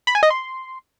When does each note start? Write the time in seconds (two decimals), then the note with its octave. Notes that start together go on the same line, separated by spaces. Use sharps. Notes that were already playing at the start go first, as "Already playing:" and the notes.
0.07 B5
0.15 G#5
0.23 D#5
0.30 C6